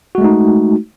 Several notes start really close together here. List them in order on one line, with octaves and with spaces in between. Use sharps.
F#4 G#3 A3 D#4